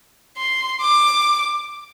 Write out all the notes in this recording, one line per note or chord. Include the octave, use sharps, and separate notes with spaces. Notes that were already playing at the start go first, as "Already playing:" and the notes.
C6
D6